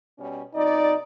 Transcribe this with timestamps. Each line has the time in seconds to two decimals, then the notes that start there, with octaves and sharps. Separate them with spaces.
0.19 B2 G3 C#4
0.55 F2 B2 D#4 D5